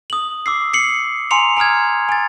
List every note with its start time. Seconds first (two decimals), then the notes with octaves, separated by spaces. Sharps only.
0.10 D#6 F#7
0.46 D6 E6 C7
0.73 C7 C#7 F#7
1.31 G#5 A#5 C6 C#7 F7
1.57 G#5 A#5 D#6 F6 G#6
2.09 G#5 A6